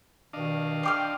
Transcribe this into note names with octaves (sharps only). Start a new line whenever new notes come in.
G2 B2 D#3 D4 D#5 F5
G5 C6 D6 F6